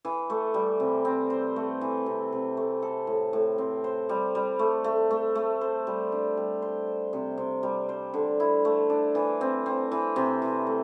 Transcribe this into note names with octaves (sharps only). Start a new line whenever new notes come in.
E3
A3
G3
C3
C4
C5
A3
E3
C3
C3
A3
A4
A2
A2
C4
C5
G3
G3
A3
A3
A3
A3
C5
G3
D4
G3
C5
C5
C3
C3
G3
C5
D3
E4
A3
D4
E3
C4
C4
E3
C3
E3
A3